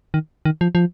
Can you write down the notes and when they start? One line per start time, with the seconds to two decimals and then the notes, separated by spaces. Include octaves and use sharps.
0.14 D#3
0.45 D#3
0.61 F3
0.75 F3